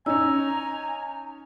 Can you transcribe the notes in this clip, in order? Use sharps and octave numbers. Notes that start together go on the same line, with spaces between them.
C#4 D#4 G#5 A#5 E6